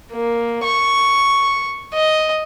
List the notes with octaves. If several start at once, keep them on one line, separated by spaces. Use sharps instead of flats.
A#3
C#6
D#5